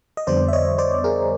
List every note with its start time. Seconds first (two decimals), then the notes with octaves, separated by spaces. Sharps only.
0.17 D#5
0.27 F2 D3 G3 B3 C5 D5
0.48 E5
0.53 C#5 D#5
0.78 C5 D5
1.04 G#4 A#4